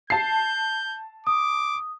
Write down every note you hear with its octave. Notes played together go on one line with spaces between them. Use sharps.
A5 G6 C7
D6 D#6